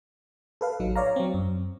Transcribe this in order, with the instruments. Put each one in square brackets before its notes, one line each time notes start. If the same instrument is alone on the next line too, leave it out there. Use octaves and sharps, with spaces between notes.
[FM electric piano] A4 B4 F5
A1 F#3 D#4
C#5 D5 F5 A#5
F#3 C4
F#2